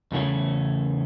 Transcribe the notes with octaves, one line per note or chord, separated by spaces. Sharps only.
E2 C#3 E3 A3 C#4